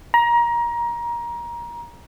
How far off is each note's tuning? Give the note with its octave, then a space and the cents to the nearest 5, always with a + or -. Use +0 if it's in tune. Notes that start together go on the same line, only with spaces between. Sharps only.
A#5 +25